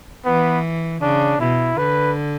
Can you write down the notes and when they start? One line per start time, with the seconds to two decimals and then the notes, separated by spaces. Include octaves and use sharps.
0.25 E3 B3
1.02 C#3 D4
1.40 B2 E4
1.77 D3 B4